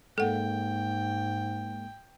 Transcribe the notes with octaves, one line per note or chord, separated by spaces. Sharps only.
G#2 G#3 A#3 A4 F#5 G5